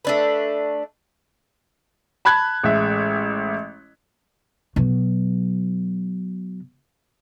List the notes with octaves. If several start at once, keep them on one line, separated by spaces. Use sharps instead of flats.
A3 D4 B4
A5 B5 F#6 G#6
A1 G#3 E5
B2 F#3